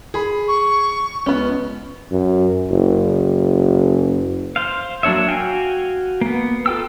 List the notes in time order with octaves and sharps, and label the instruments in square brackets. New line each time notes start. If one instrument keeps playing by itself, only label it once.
[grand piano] G#4 B5
[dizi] C#6
[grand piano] C#2 [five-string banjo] B3 C#4
[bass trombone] F#2
F#1
[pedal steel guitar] C5 F5
F#3 A#3 D4 C#5 E5
F#4 F5 G5 G#5
A#3 B3
F4 A4 G5 E6